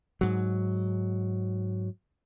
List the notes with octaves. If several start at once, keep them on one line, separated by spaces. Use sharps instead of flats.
G#2 F#3